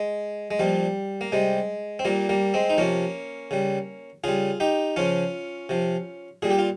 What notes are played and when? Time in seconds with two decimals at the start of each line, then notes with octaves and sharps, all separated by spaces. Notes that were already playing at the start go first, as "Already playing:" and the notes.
Already playing: G#3
0.51 G#3
0.59 A#2 F3 G3
1.21 A#3
1.32 C3 G3 G#3
1.99 C4
2.05 A#2 G3 A#3
2.29 G3 A#3
2.54 G#3 C4
2.70 D#4
2.78 C3 F3 A#3 C#4
3.51 C#3 G3
4.24 C#3 G3 F4 G#4
4.60 D#4 G4
4.96 C#3 F3 C#4 F4
5.69 C3 F3
6.42 A#2 G3 G#4
6.50 G4
6.59 F4